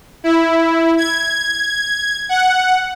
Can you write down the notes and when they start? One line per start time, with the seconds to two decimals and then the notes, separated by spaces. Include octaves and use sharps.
0.24 E4
0.98 G#6
2.29 F#5